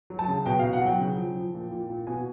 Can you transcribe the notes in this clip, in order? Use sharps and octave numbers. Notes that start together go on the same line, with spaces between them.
F#3
A5
C#3
B2 G5
B2 F5
F#5
F#3 G5
C#3
F3
F3
A#2
A#2
A#2
B2 G#5